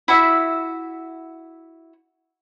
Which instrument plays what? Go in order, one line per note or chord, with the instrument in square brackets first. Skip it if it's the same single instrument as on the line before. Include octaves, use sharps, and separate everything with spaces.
[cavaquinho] E4 F#4 E5